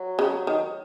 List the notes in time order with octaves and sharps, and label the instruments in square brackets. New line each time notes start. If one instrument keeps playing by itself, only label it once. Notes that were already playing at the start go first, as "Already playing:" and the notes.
Already playing: [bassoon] F#3
[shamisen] C#3
D#3